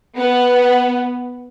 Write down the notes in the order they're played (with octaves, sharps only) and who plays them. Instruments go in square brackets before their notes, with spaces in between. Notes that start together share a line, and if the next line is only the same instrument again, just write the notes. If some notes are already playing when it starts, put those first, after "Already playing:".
[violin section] B3